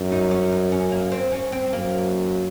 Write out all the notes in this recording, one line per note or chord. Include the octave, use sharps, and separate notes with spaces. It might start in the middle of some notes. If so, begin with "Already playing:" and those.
Already playing: F#2
D#4
C#4
D#4
C#4
A#3
C4
C#4
C4
F#2 A#3